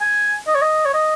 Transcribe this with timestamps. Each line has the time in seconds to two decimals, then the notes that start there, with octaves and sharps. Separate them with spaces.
0.01 G#5
0.47 D#5
0.55 C#5
0.62 D#5
0.85 C#5
0.94 D#5